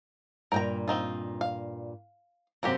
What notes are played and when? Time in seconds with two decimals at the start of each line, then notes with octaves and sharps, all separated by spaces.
0.52 G2 A#2 A#4 G5 A#5
0.88 C4 D#4 F4
1.41 F5
2.63 F#2 C3 A#3 F#4 G4